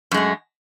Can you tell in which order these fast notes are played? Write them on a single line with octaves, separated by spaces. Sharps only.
F#2 G#3 A3